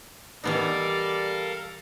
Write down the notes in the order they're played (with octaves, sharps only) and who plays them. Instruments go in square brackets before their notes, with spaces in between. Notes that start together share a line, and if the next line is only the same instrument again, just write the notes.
[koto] E3 B3 D#4 [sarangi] G3 [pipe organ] A4 A#4 F5 [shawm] D5